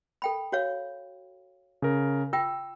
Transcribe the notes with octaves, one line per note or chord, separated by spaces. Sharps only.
A4 G5 B5
F#4 C#5 F5
C#3 A#4
F4 G5 E6